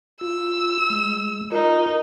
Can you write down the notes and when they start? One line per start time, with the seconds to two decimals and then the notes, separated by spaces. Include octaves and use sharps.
0.21 F4 E6
0.90 G#3
1.52 D#4 F4 A#4